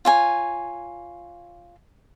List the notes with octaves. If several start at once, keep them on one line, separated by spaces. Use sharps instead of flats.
F4 C#5 G#5